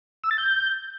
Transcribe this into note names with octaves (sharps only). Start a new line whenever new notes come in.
E6
A6
G6